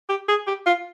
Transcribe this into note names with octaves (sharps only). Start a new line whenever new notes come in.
G4
G#4
G4
F4